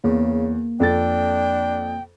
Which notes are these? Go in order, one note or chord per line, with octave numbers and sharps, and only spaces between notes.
E2 C#3 A#3
F2 D4 A4 G5 A6